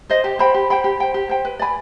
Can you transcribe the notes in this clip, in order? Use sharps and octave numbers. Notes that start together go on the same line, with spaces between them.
C5 D#5
G4
C5 G5 B5
G4
C5 G5 B5
G4
C5 G5
G4
C5 G5
B4
D5 G#5 B5